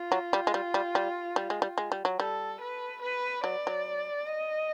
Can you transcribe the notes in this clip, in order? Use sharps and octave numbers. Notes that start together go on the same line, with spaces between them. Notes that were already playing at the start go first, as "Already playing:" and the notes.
Already playing: F4
F#3
G3
G#3
G3
G3
G3
G3
G#3
G3
G#3
G3
F#3
G3 A4
B4
B4
F#3 D5
F#3
D#5